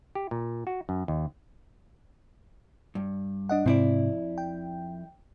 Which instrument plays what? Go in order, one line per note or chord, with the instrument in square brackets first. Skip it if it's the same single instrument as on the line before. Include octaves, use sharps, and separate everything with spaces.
[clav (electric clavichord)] G4
A#2
F#4
F#2
D#2
[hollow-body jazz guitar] G2
[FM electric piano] D4 D#5 F#5
[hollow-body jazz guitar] F2 E4 D5 [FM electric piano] G#2 C3 C4
[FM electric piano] G5